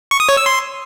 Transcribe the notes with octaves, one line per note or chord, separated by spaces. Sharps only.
C#6
D#6
C#5
E6
C6